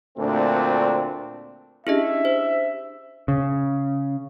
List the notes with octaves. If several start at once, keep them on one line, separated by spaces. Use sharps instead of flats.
D2 A#2 A3 C4 D4
C#4 D4 E4 G4 G#4 D#5 E5
C5
C#3